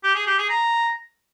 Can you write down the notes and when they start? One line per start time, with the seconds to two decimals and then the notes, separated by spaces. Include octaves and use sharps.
0.04 G4
0.15 G#4
0.27 G4
0.38 G#4
0.50 A#5